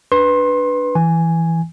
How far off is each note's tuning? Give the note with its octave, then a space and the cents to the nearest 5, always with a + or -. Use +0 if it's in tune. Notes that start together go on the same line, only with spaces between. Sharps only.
D4 +0 B4 +0 C6 +30
E3 +0 G#5 +0